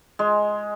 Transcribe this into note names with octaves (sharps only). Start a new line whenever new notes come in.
G#3